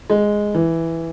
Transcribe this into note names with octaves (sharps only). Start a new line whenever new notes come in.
G#3
E3